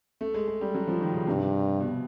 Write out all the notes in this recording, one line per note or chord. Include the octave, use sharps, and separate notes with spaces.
A3
G#3
G#3
G3
F#3
F3
D#3
C#3
G2 C3
B2